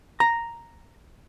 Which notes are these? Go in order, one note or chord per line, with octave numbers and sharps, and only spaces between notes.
A#5